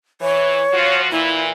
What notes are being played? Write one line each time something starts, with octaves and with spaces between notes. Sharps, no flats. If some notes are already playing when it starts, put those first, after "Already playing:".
E3 C#5
F3 F4 F#4
A#2 E3 E4